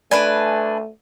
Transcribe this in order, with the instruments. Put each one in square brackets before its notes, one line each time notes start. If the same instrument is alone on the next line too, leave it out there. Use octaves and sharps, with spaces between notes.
[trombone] A3 [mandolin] D4 B4 G#5 [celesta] D5